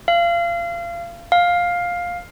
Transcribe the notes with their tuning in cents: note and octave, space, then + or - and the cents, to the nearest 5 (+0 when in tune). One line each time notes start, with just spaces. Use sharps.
F5 -30
F5 +10